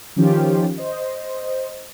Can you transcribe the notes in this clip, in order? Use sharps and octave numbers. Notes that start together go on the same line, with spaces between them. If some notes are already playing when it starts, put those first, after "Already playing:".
D#3 F3 C#4 F4 G4
C5 D#5